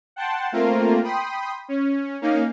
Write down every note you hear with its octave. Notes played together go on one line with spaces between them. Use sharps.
F#5 G5 A5 C6
A3 A#3 C4 F4 A#4
G5 B5 C6 D#6
C#4
A#3 C#4 D#4 F5